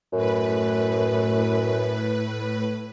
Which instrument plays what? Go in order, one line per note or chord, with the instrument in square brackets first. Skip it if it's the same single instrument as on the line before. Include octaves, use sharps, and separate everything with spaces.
[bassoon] F#2 [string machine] A2 B4